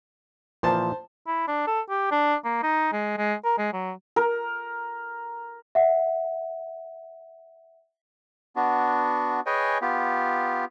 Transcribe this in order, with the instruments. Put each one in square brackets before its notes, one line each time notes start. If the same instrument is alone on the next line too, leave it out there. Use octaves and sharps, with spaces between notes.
[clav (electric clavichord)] A#2 E3 F3 [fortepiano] C5 A5 C6
[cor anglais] E4
D4
A4
G4
D4
A#3
D#4
G#3
G#3
A#4
G#3
F#3
[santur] A#4
[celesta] E5 F#5
[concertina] B3 D4 F#4
G#4 B4 C#5 D#5 G5 G#5
B3 F4 G4